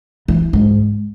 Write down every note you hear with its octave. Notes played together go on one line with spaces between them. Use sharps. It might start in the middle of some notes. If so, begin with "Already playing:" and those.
E3
G#2